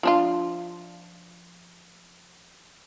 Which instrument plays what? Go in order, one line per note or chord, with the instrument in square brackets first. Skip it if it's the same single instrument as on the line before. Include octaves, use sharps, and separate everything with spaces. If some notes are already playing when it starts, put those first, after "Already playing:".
[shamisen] F3 D4 F4